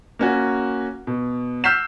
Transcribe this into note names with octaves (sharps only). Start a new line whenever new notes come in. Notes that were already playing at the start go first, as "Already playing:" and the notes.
A#3 C#4 F#4
B2
E6 F6 G6 B6 C7 E7